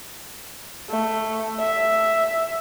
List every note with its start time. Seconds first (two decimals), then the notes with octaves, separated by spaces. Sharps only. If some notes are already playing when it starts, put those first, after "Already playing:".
0.89 A3
1.59 E5